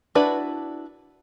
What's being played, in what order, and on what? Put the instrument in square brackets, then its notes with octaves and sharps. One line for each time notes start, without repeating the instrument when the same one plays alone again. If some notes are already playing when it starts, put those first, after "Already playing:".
[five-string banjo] D4 E4 F#4 B4 D5